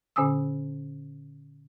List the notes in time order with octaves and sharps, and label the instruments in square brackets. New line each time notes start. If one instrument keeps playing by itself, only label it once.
[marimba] A#2 D3 C#4 G#5 D#6 E6